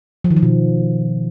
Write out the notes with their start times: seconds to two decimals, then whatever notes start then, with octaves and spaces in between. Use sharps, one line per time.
0.24 F3
0.30 D#3
0.36 F3
0.43 B2